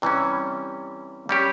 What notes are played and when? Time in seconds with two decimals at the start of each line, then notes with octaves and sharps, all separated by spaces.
0.02 C3 E3 G3 C#4
1.29 G3 C#4 G4